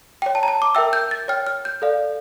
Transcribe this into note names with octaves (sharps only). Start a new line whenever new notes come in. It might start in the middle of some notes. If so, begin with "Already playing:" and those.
C#5 G5
A5
A#5
A5
D6
A#4 E5 G5 E6
G6
A6
C#5 G5 F6
F6
G6
A4 D5 F5